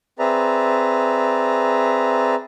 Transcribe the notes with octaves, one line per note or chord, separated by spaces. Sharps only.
C4 G#4 B4 D5 E5 A#5